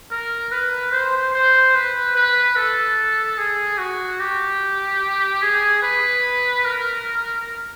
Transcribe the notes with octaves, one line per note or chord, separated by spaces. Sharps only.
A#4
B4
C5
C5
B4
B4
A4
G#4
F#4
G4
G#4
B4
A#4